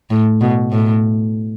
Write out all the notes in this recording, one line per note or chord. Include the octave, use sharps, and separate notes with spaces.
A2
B2
A2